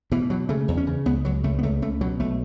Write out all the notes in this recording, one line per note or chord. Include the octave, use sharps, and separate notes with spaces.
B2 E3
B2 F#3
C#3 A3
E2
C#4
C#3
C#2 B3
C#2 F#3
C#2 A3
B3
C#2 A3
C#2 A3
B2 F#3
B1 A3